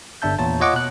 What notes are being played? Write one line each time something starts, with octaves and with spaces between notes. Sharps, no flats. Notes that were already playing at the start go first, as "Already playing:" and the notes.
G1 D4 E5 A5 G6
E2 A#2 C#5 A5
F4 C#5 D#5 F#5 D6
B2 F#6